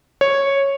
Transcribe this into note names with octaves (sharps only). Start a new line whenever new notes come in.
C#5